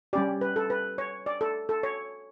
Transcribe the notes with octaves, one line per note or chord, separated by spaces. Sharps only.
G3 C#4 G4 D5
B4
A4
B4
C#5
D5
A4
A4
C#5